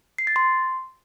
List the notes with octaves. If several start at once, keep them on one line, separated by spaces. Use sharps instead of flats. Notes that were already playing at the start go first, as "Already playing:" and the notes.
C7
A6
C6